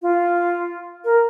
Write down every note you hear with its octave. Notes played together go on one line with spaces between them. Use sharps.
F4
A#4